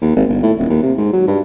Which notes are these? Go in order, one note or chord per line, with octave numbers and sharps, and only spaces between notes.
D#2
G#1
G1
A2
D#1
D#2
C3
G#2
F#3
G2